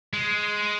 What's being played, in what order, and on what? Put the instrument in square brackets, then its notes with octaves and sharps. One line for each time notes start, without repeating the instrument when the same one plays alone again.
[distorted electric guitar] G#3